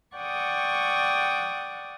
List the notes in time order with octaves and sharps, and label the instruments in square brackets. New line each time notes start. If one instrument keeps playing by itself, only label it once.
[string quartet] D5 F#5 G5 C#6 D#6